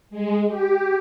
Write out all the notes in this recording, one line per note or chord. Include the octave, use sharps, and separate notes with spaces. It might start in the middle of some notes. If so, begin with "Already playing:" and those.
G#3
G4